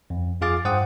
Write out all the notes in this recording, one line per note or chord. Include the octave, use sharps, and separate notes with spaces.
F2
F2 F4 G#4 F5 D6 A6
G2 C5 F#5 G5 D#6